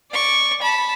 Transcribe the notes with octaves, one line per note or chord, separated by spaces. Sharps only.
D5 C#6
A5 B5